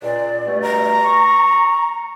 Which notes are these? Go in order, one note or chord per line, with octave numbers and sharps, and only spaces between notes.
C#2 A#2 D5
G2 B2 A3
A#5
C#6